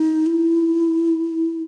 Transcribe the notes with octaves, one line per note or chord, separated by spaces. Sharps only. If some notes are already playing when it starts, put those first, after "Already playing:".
Already playing: D#4
E4